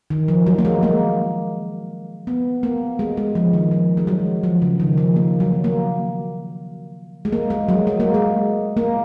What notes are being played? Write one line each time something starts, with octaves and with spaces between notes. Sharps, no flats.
D#3
F3
F#3
A#3
G#3
A#3
B3
A#3
G#3
G#3
F3
D#3
F3
G#3
F#3
F3
C#3
D#3
F3
A#3
F#3
A#3
G#3
A#3
G#3
F#3
G#3
A#3
G#3
A#3